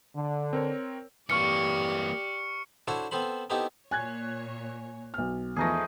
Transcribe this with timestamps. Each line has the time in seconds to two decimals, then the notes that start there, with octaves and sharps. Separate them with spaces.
0.16 D3
0.53 C4 A#4 C#5
1.30 E3 A#3 G4 D5 C#6 F6 C#7
2.87 D4 E4 F#4 A4 C5 C#5
3.11 B3 C4 A4 C5 B5
3.50 B3 C4 D#4 E4 G4 A4
3.91 A#2 C#5 G#5 F#6 G#6
5.14 B1 F6
5.56 E2 F3 A3 D#4 G#4 B4 A#6